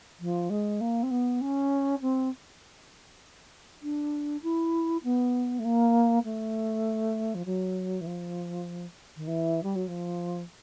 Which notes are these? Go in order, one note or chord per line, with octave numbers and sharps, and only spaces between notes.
F3
G#3
A#3
C4
B3
C#4
C4
D4
E4
B3
A3
A#3
A3
F3
F#3
E3
F3
D#3
E3
G3
F#3
F3